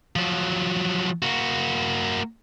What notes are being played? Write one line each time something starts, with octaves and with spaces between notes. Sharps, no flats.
F3 F#3
A#3 F#4